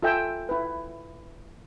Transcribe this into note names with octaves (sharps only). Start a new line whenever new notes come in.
F4 A4 E5 G5 G#5 E6
E4 B4